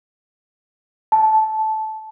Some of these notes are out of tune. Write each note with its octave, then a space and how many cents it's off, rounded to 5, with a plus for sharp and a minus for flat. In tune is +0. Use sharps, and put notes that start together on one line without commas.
A5 -15